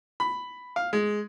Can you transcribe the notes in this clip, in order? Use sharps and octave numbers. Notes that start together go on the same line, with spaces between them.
B5
F5
G#3